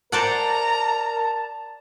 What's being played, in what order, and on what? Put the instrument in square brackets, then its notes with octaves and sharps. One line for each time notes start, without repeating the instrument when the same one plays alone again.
[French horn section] A#4 [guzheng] C5 D5 F#5 [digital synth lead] A5 [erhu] A#5